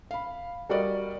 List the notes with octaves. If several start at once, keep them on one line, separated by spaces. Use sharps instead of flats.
F5 B5
G3 F#4 A#4 D5 D#5